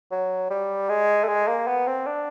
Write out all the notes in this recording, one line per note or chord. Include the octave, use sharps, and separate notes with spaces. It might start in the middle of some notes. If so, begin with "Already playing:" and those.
F#3
G3
G#3
A3
G#3
A#3
B3
C4
D4